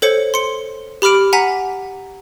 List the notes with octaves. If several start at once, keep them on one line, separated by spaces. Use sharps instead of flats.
A4 C5 C#5 C#7
C6 C#7
G4 B5 D6 F6 D7
F#5 G#5 A#5 B6